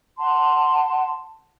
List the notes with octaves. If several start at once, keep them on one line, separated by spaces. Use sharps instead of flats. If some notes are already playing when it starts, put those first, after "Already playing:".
F#5 A5 C6